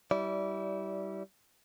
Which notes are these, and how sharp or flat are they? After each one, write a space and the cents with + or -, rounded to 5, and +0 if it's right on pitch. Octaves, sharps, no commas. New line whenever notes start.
G3 -20 E4 -20 D5 -30